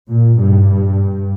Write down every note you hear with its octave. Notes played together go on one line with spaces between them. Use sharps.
A#2
G2
G2